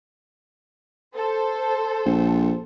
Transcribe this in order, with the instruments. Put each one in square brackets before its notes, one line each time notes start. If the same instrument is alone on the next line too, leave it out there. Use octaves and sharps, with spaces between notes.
[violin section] A4 C5
[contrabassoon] A#1